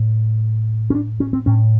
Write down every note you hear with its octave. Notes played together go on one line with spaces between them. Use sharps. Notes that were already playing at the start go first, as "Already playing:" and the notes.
Already playing: A2
C#4
D4
C#4
C4
A2 C#4